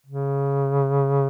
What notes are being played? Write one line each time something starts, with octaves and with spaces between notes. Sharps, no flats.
C#3